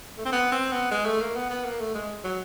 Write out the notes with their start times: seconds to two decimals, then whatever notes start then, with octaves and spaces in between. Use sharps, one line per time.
0.18 A3
0.25 C4
0.32 B3
0.52 C4
0.72 B3
0.91 G#3
1.06 A3
1.21 A#3
1.36 B3
1.50 B3
1.65 A#3
1.80 A3
1.95 G#3
2.24 F#3